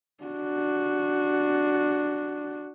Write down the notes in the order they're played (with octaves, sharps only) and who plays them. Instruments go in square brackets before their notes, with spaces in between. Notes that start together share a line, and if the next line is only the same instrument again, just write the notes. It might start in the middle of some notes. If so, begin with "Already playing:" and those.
[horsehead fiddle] D4 F#4